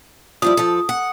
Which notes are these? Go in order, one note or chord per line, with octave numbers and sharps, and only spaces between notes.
F3 G3 E4 D#6
F3 A4
F#5